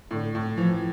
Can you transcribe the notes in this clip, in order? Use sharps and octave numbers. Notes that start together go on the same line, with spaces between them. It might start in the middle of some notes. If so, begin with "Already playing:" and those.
A2 D3
A2
E3 F3